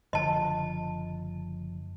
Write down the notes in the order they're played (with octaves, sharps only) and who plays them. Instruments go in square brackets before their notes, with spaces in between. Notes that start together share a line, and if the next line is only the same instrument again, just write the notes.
[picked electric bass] F#1 D3 F3 [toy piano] D#5 A5